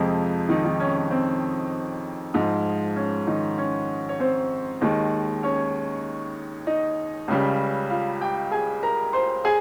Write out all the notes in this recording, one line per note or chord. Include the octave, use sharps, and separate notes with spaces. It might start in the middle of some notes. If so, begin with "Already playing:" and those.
Already playing: F2 C3 F3 G#3
D#3 D#4
D#3 D#4
C#4
C#4
C4
G#2 F3 G#3
C#4
D#3 D#4
C#4
C#5
C4 C5
D#2 D#3 G#3
C#4 C#5
D#4 D#5
C#2 C#3 G3
F4 F5
G4 G5
G#4 G#5
A#4 A#5
C5 C6
G#4 G#5